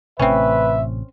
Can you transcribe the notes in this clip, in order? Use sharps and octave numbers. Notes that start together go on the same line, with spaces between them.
A1 A2 C3 C4 C#4 B4 E5